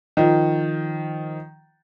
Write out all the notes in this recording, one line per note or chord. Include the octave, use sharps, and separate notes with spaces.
D#3 F3